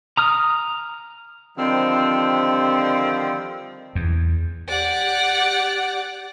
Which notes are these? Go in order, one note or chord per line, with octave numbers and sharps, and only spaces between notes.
A#5 D#6 F6
D3 D#3 F3 G3 C4
E2
G4 D5 F#5